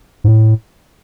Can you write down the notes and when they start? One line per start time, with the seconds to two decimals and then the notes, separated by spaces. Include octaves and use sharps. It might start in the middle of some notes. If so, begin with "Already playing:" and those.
0.24 G#2
0.28 A2